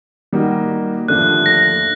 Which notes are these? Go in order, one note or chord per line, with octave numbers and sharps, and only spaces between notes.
D#3 G3 A#3 D#4 F#4
D#2 D3 F3 A3 D4 F#6
A#6